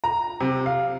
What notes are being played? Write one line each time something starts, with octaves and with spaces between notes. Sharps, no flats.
A#5
C3
F5